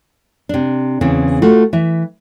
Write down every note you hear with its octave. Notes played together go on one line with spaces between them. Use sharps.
C3 D4
E2 C#3 E3 C4
A3 F4 F#4
E3 E5